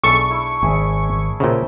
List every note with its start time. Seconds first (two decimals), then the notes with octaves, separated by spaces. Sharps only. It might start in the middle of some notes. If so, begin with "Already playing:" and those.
0.04 B1 D4 E4 G#4 A4 A5 C#6
0.31 E4
0.63 G#1 G#4 E5 G#5
1.40 A#2 C#3 C5 E5 G5